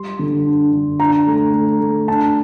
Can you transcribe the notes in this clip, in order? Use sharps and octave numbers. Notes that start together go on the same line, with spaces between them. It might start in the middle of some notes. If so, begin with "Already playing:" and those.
Already playing: G3 C6
D3
D4
D3
D4 A#5
A3
A3
A3
D4 A5